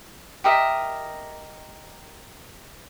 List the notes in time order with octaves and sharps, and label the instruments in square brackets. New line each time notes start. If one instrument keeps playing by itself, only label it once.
[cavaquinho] G4 A#4 D#5 E5